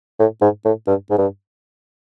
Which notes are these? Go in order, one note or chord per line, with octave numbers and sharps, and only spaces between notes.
A2
G#2
A2
G2
G#2
G2